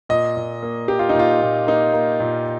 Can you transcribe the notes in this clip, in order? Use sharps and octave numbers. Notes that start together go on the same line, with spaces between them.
A#2 D#5
A#2
A#3
A#3 G4
F4
D#4
A#2 F4
A#2
A#3 D#4
A#3
A#2